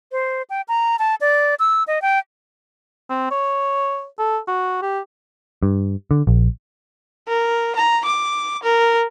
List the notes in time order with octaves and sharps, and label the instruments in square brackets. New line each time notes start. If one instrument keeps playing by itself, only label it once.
[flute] C5
G5
A#5
A5
D5
E6
D#5
G5
[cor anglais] C4
C#5
A4
F#4
G4
[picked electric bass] G2
D3
A#1
[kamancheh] A#4
A#5
D6
A#4